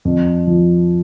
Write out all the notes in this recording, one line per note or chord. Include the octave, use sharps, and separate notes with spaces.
F2
F3